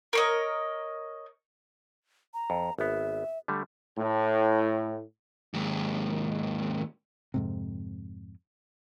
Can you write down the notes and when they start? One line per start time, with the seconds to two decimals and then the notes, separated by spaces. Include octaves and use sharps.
0.13 A#4 C#5 D#5
2.34 A#5
2.50 F2
2.79 G#1 B3 E5
3.48 D3 G3 A3
3.98 A2
5.54 D#2 G#2
7.34 F2 G#2 C3